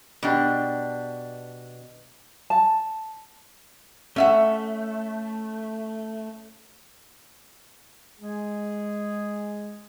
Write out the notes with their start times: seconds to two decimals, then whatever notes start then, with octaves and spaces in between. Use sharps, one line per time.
0.23 B2 D4 G4
2.50 A5
4.16 A3 C#4 E5 F#5
8.20 G#3 G#4